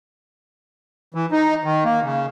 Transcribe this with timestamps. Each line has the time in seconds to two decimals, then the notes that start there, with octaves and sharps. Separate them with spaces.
1.15 E3
1.32 D#4
1.64 D#3
1.85 A#3
2.03 C#3